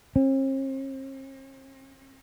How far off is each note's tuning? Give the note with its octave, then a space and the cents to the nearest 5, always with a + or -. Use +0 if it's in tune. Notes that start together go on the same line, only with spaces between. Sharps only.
C4 +45